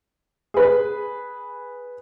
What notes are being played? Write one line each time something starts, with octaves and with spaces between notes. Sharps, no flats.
G#4 B4